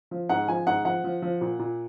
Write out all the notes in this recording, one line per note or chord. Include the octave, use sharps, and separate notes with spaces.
F3
G#2 F#5
F3 G#5
G#2 F#5
F3 F#5
F3
F3
A#2
A#2